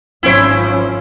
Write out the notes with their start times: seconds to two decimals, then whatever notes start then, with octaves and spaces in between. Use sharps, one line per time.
0.23 G#1 F3 C#4 E4 C5